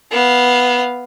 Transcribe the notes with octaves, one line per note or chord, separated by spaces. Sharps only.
B3 F5